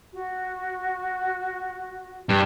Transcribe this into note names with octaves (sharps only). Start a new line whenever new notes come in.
F#4
G2